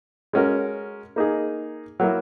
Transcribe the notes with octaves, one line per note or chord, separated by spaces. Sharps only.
G#3 C#4 F#4 A#4
A#3 D#4 G#4
F#3 A#3 E4